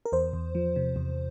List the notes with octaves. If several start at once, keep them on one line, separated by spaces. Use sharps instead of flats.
A#4
E2 C5
E2
F3
C3
E2